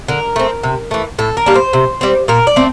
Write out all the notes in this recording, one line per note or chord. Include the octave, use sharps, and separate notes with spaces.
D3 A#4
A3 C4
C3
E3 A3
A2 A4
A#4
G3 A#3 D4
C5
C3
G3 C4
A#2 A#4
D5
A3 C4